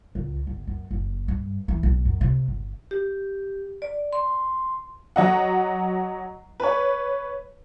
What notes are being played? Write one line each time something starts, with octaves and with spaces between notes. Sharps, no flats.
C#2
G1
F#2
F#1
G2
E3
B1
F#2
C3
G1
G4
D5
C6
F#3 D#5 F#5
B4 C#5